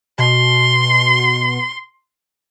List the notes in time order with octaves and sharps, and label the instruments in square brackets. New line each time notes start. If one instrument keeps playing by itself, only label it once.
[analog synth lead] B2 [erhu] C6